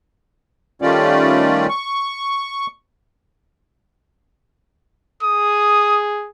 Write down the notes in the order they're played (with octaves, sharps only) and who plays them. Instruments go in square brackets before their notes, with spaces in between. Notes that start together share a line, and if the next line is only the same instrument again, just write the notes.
[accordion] D#3 G3 A3 C#4 F4 D5
C#6
[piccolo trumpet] G#4 [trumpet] D#6